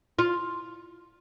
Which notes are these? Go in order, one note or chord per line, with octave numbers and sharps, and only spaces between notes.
F4